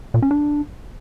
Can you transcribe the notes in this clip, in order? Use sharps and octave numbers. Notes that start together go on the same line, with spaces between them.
A#2
C#4
D4